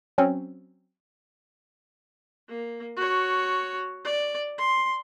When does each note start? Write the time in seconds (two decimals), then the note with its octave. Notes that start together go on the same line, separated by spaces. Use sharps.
0.18 F#3 C4 C#4
2.49 A#3
2.96 F#4 C#5
4.04 D5
4.58 C6